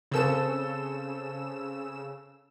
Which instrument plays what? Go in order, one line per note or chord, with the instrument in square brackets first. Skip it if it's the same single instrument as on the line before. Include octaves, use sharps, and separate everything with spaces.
[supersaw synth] C#3 E6 E7 [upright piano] C4 A4